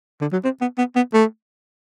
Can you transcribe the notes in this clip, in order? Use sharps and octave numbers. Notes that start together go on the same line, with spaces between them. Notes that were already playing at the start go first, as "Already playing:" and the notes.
D3
F#3
C4
B3
B3
B3
A3